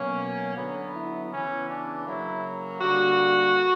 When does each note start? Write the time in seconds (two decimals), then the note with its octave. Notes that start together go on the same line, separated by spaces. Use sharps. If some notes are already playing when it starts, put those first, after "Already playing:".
Already playing: B2 F#3 A#3 C#4
0.56 D3 F#3 B3
0.94 E4
1.31 C#3 E3 B3 C#4
1.69 D4
2.06 C#3 F#3 A#3 E4
2.81 D3 G3 A#3 F#4